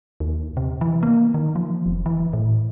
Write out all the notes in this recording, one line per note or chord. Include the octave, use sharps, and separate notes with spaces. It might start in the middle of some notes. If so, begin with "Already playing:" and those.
D#2
C3
E3
A#3
D#3
F3
F1
E3
A2